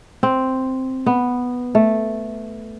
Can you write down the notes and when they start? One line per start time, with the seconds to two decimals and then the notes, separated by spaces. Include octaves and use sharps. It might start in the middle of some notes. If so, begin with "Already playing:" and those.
0.23 C4
1.06 B3
1.75 A3